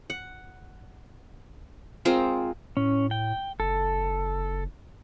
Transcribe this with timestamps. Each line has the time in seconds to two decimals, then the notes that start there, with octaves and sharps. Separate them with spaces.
0.10 F#5
2.05 G#3 C4 F4 A#4
2.77 A2 C#4
3.11 G5
3.60 F#1 A4